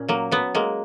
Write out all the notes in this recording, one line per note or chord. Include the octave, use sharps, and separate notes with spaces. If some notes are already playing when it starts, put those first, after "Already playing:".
Already playing: A#2 C#4
F#3 A#3
F#3 B3
G#3 A#3